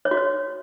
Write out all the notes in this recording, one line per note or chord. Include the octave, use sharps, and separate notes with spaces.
C#5
F#4
C#5